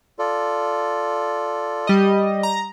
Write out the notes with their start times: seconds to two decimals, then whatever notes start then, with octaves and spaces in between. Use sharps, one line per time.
0.19 F4 A4 D5
1.87 G3 D#5
2.43 A#5